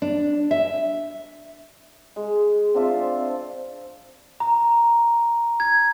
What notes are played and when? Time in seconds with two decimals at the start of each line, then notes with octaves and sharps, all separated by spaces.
0.02 D4
0.51 E5
2.16 G#3
2.74 C4 D4 F4 E5
4.40 A#5
5.60 G#6